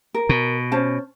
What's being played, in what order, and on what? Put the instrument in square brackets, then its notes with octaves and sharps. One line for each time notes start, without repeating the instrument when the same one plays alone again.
[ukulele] A#4
[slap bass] B2
[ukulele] C#4 C5 A5